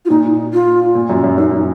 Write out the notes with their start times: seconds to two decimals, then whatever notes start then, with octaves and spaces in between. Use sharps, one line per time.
0.05 F4
0.10 A#2 D#4
0.53 F4
0.95 A#2
1.09 F#2
1.24 F#2
1.38 F#2 D#4